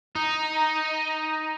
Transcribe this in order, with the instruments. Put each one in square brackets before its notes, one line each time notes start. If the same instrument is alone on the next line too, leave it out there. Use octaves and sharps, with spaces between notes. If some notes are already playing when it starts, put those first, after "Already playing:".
[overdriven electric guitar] D#4